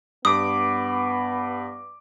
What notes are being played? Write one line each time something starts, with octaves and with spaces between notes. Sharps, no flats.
G2 B3 D6 D#6